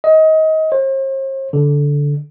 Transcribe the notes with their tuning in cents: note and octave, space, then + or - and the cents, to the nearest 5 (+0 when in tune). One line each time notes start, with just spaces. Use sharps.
D#5 +25
C5 +45
D3 -15